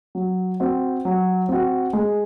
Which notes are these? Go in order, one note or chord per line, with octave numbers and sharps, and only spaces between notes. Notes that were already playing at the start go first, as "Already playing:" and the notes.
F#3
C4 F#4
F#3
C4 F#4
G#3